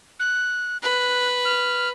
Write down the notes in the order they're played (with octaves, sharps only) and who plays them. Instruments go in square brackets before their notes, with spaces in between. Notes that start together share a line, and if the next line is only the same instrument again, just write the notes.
[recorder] F#6
[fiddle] B4 [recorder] F#6
[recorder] F6